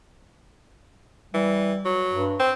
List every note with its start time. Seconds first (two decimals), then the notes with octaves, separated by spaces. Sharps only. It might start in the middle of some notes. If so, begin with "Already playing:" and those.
1.34 E3 G3
1.85 F#3
2.13 G2
2.39 C4